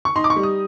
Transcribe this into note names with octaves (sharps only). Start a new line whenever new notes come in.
C#6
D#4 C6
D6
C#6
G3
D#6